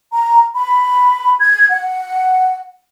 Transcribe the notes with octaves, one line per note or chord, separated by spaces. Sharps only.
A#5
B5
G#6
F#5